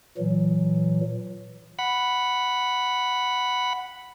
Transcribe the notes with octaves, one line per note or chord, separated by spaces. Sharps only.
A#2 E3 F#3
F#5 B5